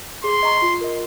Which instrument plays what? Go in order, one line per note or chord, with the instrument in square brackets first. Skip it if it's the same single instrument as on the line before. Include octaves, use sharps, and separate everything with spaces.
[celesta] G#4 [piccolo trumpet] C6
[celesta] D#5 A#5 C#6
F4
A#4 D#5